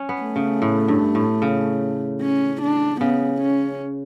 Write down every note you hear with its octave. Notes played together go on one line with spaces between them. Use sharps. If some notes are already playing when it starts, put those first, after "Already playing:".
Already playing: C#4
B3
A3
C#3
A2
G2
A2
C#3
C#4
D4
C#3 B3
C#4